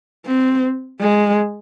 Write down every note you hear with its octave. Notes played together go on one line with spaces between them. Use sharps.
C4
G#3